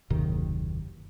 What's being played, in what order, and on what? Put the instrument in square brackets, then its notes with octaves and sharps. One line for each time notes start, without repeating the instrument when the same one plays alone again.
[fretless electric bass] F#1 D#2 C3 D#3